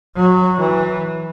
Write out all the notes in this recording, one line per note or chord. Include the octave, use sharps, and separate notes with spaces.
F#3
E3